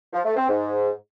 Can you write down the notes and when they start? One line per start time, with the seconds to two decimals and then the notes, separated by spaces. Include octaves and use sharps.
0.12 F3
0.24 A3
0.36 C4
0.48 G#2